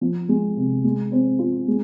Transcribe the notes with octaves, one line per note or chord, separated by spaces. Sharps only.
F3
G#3
C3
G#3
C4
F4
G#3